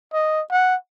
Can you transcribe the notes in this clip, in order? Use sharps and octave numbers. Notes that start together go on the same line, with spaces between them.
D#5
F#5